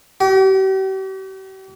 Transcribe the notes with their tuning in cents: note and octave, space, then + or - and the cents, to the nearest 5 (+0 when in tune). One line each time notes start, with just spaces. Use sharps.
G4 -40